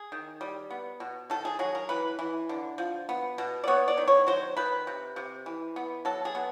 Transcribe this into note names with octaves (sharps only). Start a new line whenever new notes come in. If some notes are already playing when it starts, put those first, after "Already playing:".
Already playing: G#4
D#3
G3
B3
B2
D#3 A4
G#4
F#3 G#4
A#4
E3 B4
E3
D3
F3
B3
B2
D5
B3 C#5
D5
D#3
C#5
F#3 C5
D#3 B4
C3
C3
E3
B3
F#3 A4
G#4
B3